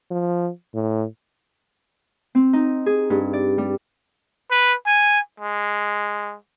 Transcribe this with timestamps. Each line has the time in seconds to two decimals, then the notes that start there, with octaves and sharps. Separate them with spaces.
0.11 F3
0.74 A2
2.35 C4
2.53 D#4
2.86 G#4
3.10 G2
3.33 D5
3.58 G3
4.51 B4
4.87 G#5
5.40 G#3